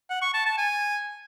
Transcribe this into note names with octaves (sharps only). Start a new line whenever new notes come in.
F#5
C#6
A5
A5
G#5